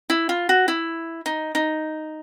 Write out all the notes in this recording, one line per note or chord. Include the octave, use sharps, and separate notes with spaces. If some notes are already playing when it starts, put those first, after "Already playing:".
E4
F4
F#4
E4
D#4
D#4